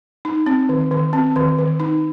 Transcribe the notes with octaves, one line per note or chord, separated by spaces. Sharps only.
D#4
C4
D#3
D#3
C4
D#3
D#3
D#4